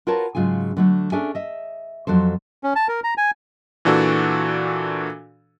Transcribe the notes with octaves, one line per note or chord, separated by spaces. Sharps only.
F4 F#4 A#4 B4 C#5 A5
G#2 C#3 F#3 F4 G#5
D3 F#3 A3
C#4 D4 G#4 A4 E5 G#5
D#5 E5
F2 F#3 A4 C5
C#4
A5
A#4
A#5
G#5
A#2 E3 D4 F#4 A4